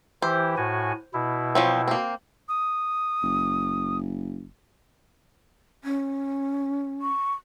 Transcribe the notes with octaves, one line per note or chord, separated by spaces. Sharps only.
E3 E4 G4 C5
A2 F#4 G#5
B2 E4
F3 F#3 C4
A#3 C4
D#6
F#1
C#4
C#6